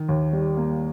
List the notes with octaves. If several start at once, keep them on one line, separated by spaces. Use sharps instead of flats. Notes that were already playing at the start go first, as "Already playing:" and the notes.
Already playing: D#3
D#2
G3
A#3